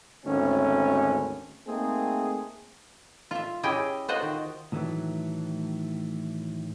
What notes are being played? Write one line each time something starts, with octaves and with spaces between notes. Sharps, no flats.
G#1 D2 A3 C#4
A3 A#3 C4 D#4 G#4
F4 E5
C#4 E4 G4 G#4 D#5 G5
F4 F#4 C5 D#5 F#5
D#3
A2 D#3 E3 F#3 A3